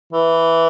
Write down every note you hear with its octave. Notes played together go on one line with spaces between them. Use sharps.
E3